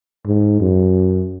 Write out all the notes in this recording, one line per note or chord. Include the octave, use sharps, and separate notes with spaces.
G#2
F#2